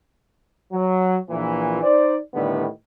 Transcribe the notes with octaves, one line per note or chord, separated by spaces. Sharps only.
F#3
A#1 A#2 E3
D#4 C5 D5
A2 D3 D#3 G3 B3